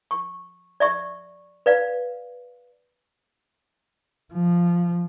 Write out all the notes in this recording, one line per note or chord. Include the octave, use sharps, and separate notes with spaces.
C#6
D5 E5 C#6
B4 D5 F5
F3